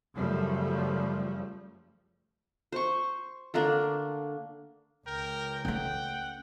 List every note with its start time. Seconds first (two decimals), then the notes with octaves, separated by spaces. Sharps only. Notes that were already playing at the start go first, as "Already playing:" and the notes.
0.14 F#2 C#3 F3 G3 A3
2.72 C5 C#6
3.54 D3 A3 A#3 D4
5.07 C#2 A#4 G5
5.65 A3 C#4 F#5 G5